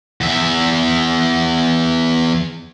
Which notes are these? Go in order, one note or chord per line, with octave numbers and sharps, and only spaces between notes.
E2 E5